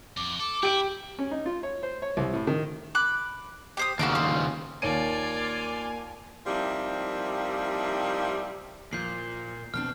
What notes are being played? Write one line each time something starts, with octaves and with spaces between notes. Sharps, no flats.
F2 D6
A4 D6
E4 G4 D7
C#4
D#4
F4
C#5
C5
C#5
C2
A2
D#3
B5 D6 F#6
G4 C5 D#6
D#2 C#3 F#4 A#4 D6
C5
D#2 A#3 F4 A#4 C#5 D5 G#5 D#7
C3 F3 G3 A#3 D#4 E4
A#2 F3 G6 C7
B2 C4 D4 F6